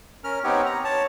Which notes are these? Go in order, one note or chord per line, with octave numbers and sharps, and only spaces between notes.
C#4 A#4 F6
B3 C4 D#4 G4 C#5
A#5
C#5 A5